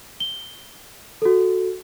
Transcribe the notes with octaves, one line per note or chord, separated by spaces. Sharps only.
G7
F#4 A4